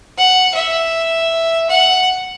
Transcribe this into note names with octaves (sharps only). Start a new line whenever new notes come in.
F#5
E5
F#5